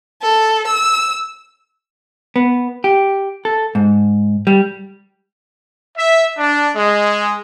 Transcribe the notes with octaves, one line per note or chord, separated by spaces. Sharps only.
A4
E6
B3
G4
A4
G#2
G3
E5
D4
G#3